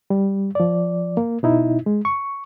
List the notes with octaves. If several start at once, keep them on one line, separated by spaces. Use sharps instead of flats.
G3
F3 D5
A#3
B2 D#4 E4
G#3
C#6